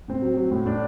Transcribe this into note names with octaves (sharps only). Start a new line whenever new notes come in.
A2 C4
F#3
F#3
A2
A2 D4